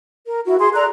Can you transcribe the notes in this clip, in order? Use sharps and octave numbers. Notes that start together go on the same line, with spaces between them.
A#4
E4 F#4
G#4 C6
A4 D5 A#5 F#6